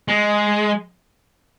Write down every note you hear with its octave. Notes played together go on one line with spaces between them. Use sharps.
G#3